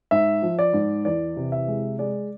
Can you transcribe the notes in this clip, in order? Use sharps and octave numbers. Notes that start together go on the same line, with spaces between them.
G#2 E5
F3
D5
G#2
E2 D5
C3
E5
G#3
G#3 D5